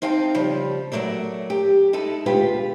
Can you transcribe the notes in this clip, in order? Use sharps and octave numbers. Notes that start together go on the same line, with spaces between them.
C4 D#4 F5 G5 A5
C#3 F3 G3
F#3 G#3 A3 A#4 D5
G4
G#3 D#4 E4 A4
D2 B2 G#3 F4 G4 B4